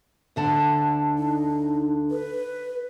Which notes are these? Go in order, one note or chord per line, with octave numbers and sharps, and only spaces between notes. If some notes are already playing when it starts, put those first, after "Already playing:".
D2 D3 A5
D#4
B4